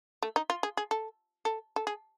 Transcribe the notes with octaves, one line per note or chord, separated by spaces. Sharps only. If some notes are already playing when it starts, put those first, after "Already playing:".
A3
D#4
F4
G#4
G#4
A4
A4
A4
G#4